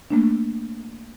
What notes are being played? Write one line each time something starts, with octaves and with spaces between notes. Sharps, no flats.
A3 A#3 D4